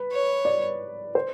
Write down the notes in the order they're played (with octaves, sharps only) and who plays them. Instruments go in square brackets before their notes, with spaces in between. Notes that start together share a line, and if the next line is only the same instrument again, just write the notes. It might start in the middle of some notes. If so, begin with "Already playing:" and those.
Already playing: [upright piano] B4
[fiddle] C#5
[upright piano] D5
C5